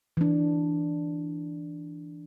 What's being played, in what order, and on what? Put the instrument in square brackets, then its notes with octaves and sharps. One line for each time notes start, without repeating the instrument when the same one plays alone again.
[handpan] E3 D4